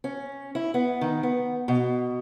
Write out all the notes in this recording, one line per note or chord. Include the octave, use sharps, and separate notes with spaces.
C#4
E4
B3
D#3
B3
B2